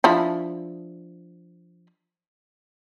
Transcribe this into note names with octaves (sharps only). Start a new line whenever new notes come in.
F3 D4 E4